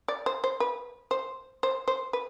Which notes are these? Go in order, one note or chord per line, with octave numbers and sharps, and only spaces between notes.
D5
C5
C5
B4
C5
C5
C5
B4